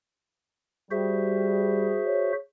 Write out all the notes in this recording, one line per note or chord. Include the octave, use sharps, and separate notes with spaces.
G3 F#4 G#4 C5 E5
C#5